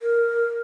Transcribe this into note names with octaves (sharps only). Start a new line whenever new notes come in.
A#4